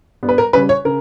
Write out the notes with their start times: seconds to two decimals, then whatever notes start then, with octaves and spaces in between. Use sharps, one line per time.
0.23 G2 G3 B3
0.29 B4
0.38 A#4
0.53 C#3 G3 C#4 B4
0.69 C#5
0.85 C#3 A#4